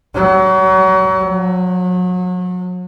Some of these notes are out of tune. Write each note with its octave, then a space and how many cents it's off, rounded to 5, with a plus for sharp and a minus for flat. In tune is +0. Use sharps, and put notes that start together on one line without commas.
F#3 +35
F#3 -35